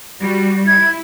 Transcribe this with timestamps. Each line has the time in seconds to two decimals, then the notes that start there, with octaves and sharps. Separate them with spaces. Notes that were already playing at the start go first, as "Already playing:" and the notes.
0.21 G3 F#4
0.67 E4 G#6